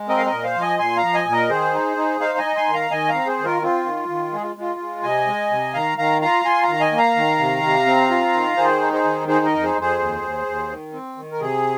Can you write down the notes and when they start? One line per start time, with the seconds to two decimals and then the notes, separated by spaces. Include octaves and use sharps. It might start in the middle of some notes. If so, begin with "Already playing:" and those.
Already playing: G#3
0.09 C4 A#4 D#5
0.17 F5
0.26 A#4 D#5
0.32 A#2
0.44 C5 F5
0.56 F3
0.61 D#5 G#5
0.79 A#2 G#5 C6
0.97 F5 A#5
1.03 F3
1.14 D#5 G#5
1.26 A#2
1.32 A#4 D#5
1.50 D#3 G#4 C5
1.74 D#4
1.97 D#4
2.20 D#4 C5 F5
2.38 D#5 G#5
2.44 D#4
2.56 G#5 C6
2.68 D#3
2.74 F5 A#5
2.91 D#3 D#5 G#5
3.09 F5 A#5
3.14 C4
3.27 G#4 C5
3.39 D#3
3.44 F4 A#4
3.62 C4 F4
3.85 D#3
4.09 D#3
4.33 G#3 G#4
4.42 F4
4.57 G#3 F4
4.80 G#3
5.03 C3 D#5 G#5
5.27 G#3
5.51 C3
5.74 D#3 F5 A#5
5.98 D#3 F5 A#5
6.21 F4 F5 A#5
6.45 F4 G#5 C6
6.63 F5 A#5
6.68 D#3
6.80 D#5 G#5
6.92 A#3
6.98 F5 A#5
7.16 D#3
7.39 C3
7.63 C3
7.86 C4
8.10 F4
8.34 D#3
8.57 D#3 G#4 C5
8.81 D#4
8.93 G#4 C5
9.04 D#3
9.28 D#4 G#4 C5
9.46 A#4 D#5
9.52 F2
9.64 G#4 C5
9.75 F2
9.81 G#4 C5
9.99 D#2
10.22 D#2
10.46 D#2
10.69 D#3
10.93 C4
11.17 D#3
11.32 A#4
11.40 C3 G#4